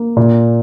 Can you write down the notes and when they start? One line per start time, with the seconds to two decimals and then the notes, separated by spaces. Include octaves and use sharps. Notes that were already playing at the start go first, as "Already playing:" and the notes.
Already playing: A#3
0.17 A#2